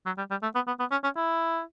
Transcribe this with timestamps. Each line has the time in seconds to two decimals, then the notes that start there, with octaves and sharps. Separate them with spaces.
0.06 F#3
0.18 G3
0.30 G3
0.42 A3
0.55 B3
0.67 B3
0.80 B3
0.91 C#4
1.04 C#4
1.16 E4